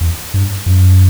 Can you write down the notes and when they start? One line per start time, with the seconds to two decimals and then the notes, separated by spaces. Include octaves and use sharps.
0.01 E2
0.34 G2
0.66 F#2